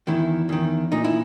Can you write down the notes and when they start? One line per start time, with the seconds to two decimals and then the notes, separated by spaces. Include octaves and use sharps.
0.07 E2 D#3 E4
0.49 E2 D#3
0.92 A#2 D#4
1.04 E4